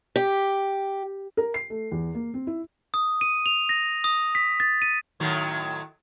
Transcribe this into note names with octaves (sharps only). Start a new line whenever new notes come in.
G4
A#4
C7
A3
E2
A#3
C4
E4
D#6
D#7
F7
A#6
D#6
B6
A6
D#7
A2 D#3 F#3